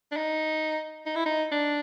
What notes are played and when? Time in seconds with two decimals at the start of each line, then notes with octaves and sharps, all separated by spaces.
0.12 D4
0.17 D#4
1.06 D#4
1.16 E4
1.26 D#4
1.52 D4